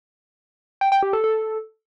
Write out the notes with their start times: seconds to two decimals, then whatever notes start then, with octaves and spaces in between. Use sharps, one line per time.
0.81 G5
0.92 G5
1.03 G4
1.13 A4
1.24 A4